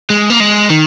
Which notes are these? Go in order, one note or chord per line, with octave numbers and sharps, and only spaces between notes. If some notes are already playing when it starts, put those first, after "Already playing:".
G#3
A#3
G#3
D#3